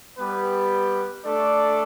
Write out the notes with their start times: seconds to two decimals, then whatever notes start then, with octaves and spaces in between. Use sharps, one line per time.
0.18 G3 B3 G4 B4
1.24 A3 D4 A4 D5